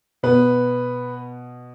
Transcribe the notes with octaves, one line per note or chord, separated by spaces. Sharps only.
B2 B3 B4